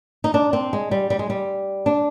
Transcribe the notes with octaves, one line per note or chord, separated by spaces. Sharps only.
D#4
D4
C4
G#3
G3
G3
G#3
G3
D4